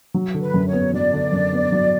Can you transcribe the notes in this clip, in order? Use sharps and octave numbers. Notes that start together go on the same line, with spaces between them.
F#3
D3
B4
F#2
C#5
B3
F#3 D5
D3
F#2
B3
F#3